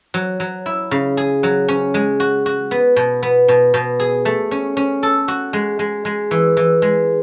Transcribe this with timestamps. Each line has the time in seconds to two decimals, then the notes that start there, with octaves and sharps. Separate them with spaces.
0.14 F#3
0.40 F#3
0.66 E4
0.91 C#3
1.17 G#4
1.43 F#3
1.68 C#4
1.94 G#3
2.20 F#4
2.46 F#4
2.71 B3
2.96 B2
3.23 B3
3.48 B2
3.74 B2
4.00 G#4
4.25 A3
4.51 C#4
4.77 C#4
5.03 A4
5.28 F#4
5.53 G#3
5.79 G#3
6.05 G#3
6.31 E3
6.57 E3
6.82 G#3